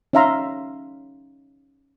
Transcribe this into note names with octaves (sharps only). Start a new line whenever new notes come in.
C#4 D#4 E5 F5 A#5 C6